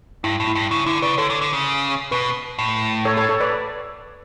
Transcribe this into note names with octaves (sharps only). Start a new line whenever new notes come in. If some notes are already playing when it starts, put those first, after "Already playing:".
G2 E4
A2
E4
G2
C#3 E4
D3 E4
C#3 B4 D5
D3 A4 C#5
D3
D3
C#3
B2 B4
A2
A4 C#5
A4 C#5
A4 C#5
B4 D5